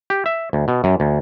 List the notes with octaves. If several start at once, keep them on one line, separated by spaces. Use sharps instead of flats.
G4
E5
D2
B2
F#2
D2